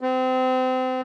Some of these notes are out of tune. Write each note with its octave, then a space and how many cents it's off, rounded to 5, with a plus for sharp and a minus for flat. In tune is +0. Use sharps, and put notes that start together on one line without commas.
C4 -30